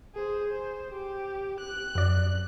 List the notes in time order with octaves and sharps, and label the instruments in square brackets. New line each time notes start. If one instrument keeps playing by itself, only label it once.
[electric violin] G#4 C5
C5
G4
F#6
[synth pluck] F#2 D5